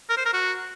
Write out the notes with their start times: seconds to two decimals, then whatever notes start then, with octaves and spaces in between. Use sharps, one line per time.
0.09 A#4
0.17 C5
0.25 A#4
0.33 F#4